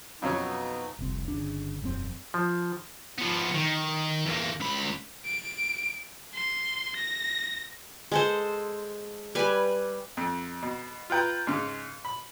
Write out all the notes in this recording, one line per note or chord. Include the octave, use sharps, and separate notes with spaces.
F2 B2 F#3 C#4 D#4
F1 C2 C4
G1 C#3 D4
E1 F#2 F3 C4
F3
F3 B3
D#3
E2 A#3
C#2 B5
D7
C6
A#6
G#3 A4 C5
G3 B4 G#5 B5
F2
B2
F4 B4 G5 A#5
G#2 C#3
B5